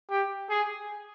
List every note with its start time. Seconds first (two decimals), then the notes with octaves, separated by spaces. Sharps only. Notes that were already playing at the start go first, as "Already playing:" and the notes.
0.10 G4
0.50 G#4